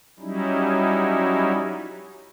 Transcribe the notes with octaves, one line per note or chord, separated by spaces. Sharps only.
F#3 G3 C#4 D#4 E4